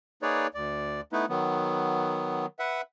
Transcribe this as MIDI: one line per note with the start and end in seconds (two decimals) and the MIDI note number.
0.22 0.47 58
0.22 0.47 63
0.22 0.47 68
0.22 0.47 71
0.22 0.47 73
0.22 0.47 74
0.54 1.01 38
0.54 1.01 74
1.12 1.26 57
1.12 1.26 59
1.12 1.26 63
1.12 1.26 64
1.12 1.26 71
1.29 2.46 51
1.29 2.46 54
1.29 2.46 59
2.59 2.81 71
2.59 2.81 76
2.59 2.81 78